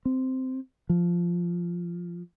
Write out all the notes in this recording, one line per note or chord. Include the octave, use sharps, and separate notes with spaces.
C4
F3